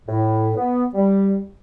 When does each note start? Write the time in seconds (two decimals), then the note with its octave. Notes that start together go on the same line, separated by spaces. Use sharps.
0.07 A2
0.56 B3
0.94 G3